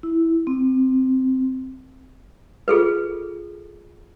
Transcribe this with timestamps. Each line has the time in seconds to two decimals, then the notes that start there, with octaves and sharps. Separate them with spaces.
0.03 E4
0.47 C4
2.68 F4 G#4 A4 B4